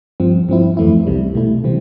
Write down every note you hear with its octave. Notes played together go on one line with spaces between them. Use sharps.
G2 F3 C4
G2 F3 C4 E4
F2 E3 A3 E4
C2 C3 G3
B2 A3 E4
C3 E3 G3 C4